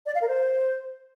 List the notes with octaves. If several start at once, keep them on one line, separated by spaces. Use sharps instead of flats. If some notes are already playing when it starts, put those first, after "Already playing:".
D5
F5
A#4
C5